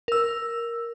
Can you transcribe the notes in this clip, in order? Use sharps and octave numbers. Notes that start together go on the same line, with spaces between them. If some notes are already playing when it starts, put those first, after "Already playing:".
A#4 E6